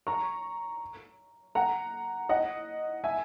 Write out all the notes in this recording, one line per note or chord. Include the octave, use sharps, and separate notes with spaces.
A#5 C#6
F#5 A#5
D#5 F#5
E5 G#5